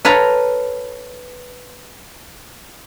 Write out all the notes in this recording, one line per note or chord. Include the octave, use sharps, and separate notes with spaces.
A4 B4 C#5 F5 A#5